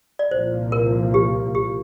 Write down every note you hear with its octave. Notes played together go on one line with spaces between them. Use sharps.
D5
C2 A#2 F3 A#3 C5
A#4
G4
G4